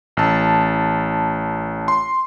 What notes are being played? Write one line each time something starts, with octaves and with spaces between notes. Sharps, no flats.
A1 A5
C6